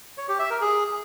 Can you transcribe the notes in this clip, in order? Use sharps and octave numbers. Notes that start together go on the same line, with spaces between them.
C#5
G4
E5
A#4
G#4